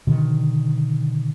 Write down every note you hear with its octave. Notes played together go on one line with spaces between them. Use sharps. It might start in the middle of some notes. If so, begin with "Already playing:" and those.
B2 D3 D#3